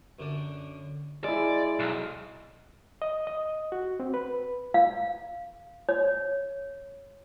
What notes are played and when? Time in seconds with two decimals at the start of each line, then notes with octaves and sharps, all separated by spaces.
0.19 F#2 D3 D4
1.24 G#3 E4 D5
1.79 B1
3.02 D#5
3.27 D#5
3.72 F#4
4.00 C4
4.14 B4
4.74 F5
5.89 C#5